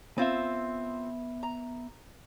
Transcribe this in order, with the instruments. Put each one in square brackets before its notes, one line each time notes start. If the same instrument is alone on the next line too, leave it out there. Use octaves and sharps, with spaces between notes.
[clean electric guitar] B3 E5 [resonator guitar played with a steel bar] C4 F4
[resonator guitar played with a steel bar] A#5